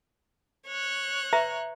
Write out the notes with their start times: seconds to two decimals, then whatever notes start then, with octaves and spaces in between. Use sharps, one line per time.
0.67 C#5 F#6
1.33 B4 E5 A#5